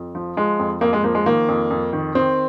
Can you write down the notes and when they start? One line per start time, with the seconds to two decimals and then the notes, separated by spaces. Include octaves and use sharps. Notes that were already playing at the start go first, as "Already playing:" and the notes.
Already playing: F2
0.15 F3
0.37 F3 G#3
0.59 F2
0.81 F2 A#3
0.93 G#3
1.04 F3 A#3
1.15 G#3
1.26 D#3 A#3
1.48 F2
1.70 F2
1.93 D#3
2.15 D#3 C4